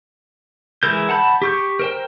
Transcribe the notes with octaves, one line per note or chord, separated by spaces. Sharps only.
E3 G#3 E4 A#4 G6
F#5 A5 B5 G6
G4 C#6 G6
A#4 C5 G5